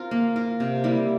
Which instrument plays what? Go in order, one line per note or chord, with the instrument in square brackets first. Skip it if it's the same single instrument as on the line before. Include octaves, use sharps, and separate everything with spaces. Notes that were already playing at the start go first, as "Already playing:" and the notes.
Already playing: [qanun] C4 F4 A#4
A#3
F4 A#4
C3
G3 A#3 E4